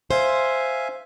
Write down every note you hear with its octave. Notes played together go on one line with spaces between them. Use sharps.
C5 E5 F5 G#5